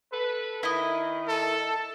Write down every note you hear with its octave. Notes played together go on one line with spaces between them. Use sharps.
A4 B4
D#3 E4 D#5
A4